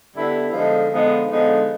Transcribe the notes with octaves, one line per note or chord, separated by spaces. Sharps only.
D3 G3 B3 E4
D3 F3 G#3 B3 D#4
D3 F3 G#3 B3 D#4
D3 F3 G#3 B3 D#4